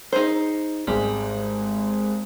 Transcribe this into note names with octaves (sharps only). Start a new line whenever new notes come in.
D#4 G#4 C5
G#1 G3 G#3